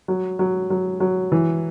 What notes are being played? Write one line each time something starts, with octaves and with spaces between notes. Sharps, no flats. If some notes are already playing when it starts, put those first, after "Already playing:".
F#3
F#3
F#3
F#3
E3